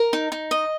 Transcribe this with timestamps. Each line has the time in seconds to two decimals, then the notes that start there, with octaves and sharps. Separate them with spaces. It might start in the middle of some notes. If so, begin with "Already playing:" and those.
Already playing: A#4
0.13 D#4
0.32 D#4
0.51 D#5